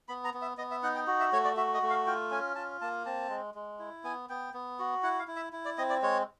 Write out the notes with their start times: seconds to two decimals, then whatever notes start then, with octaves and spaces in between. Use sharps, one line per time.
0.08 B3 B5
0.25 A#5
0.34 B3
0.42 E5
0.58 B3 D#5
0.71 E5
0.83 D#4 F#5
0.95 G5
1.07 F#4
1.20 E5
1.32 A3 C#5
1.45 D5
1.57 F#4 E5
1.74 D#5
1.82 A3
1.90 F5
2.06 F4 G5
2.31 C#4 G#5
2.56 F4 A5
2.81 A#3 A5
3.06 C4 A5
3.30 G#3
3.54 G#3
3.79 E4
4.04 B3 G#5
4.29 B3 G5
4.54 B3
4.79 F#4
5.03 E4 F#5
5.19 F5
5.28 E4
5.36 E5
5.53 E4
5.65 D5
5.78 C4 D#5
5.90 D5
6.02 G#3 C#5